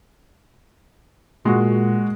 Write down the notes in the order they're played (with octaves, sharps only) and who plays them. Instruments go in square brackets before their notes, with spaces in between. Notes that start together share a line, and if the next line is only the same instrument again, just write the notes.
[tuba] A#2 [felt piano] G#3 F#4